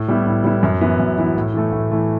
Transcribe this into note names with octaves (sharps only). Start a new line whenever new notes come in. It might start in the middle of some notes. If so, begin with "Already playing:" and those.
Already playing: A2
G3 B3 E4
A2
G3 B3 E4
F#2
E3 B3 E4
F#2
E3 B3 E4
A2
E3 A3
A2
E3 A3